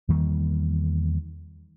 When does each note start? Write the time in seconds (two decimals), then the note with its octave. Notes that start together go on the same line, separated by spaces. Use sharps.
0.09 E2 D#3 G3 A#3